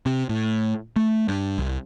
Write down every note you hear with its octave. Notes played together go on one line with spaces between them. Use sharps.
C3
A2
A3
G2
C2